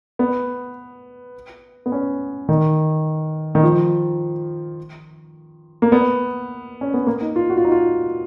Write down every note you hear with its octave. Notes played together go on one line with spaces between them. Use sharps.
B3
B3
C#4
D#3
D#3
F3
A#3
B3
C#4
B3
A#3
D#4
F4
F#4
F4
D#4
F4